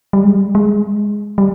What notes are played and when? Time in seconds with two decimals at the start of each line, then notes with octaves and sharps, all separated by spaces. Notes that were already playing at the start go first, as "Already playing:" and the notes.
0.13 G3
0.24 G#3
0.34 G3
0.55 G#3
1.38 G3